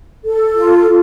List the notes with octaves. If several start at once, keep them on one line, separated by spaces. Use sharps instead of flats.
A4
F4